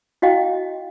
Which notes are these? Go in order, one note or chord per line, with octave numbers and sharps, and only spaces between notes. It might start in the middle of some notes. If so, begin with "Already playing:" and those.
E4 F#4 D#5 F5 G5